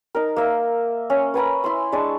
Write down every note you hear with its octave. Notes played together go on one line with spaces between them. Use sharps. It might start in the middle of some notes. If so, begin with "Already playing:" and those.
D#4 A#4
A#3 E5
C#4
B4 G#5 A#5 B5
E4 B5 C6
G#3 D4 A5 C#6